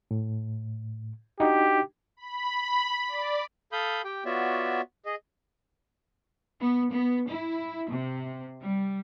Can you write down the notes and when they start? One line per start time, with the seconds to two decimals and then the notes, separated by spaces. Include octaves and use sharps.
0.11 A2
1.40 D4 D#4 F#4 G4
2.17 B5
3.08 D5
3.72 A4 F5 B5 D#6 G6
4.04 G4 G5
4.25 B3 F4 F#4 C#5 D5 E5
5.06 G#4 D#5
6.61 B3
6.93 B3
7.29 E4
7.90 C3
8.61 G3